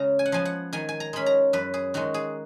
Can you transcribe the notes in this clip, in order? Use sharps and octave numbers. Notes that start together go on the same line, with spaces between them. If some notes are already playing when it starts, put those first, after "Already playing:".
Already playing: C#3 G#3 C#4 A#5
G#5
F#5
F3 B3 G#5
F#5
D#3 G#5
G#5
A#5
G#3 C#4 B5
A#5
F#2 B4
G#4
D#3 G#3 F#4
G#4